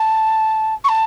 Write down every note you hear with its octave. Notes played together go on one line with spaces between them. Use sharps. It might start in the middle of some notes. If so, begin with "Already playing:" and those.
Already playing: A5
C#6
A5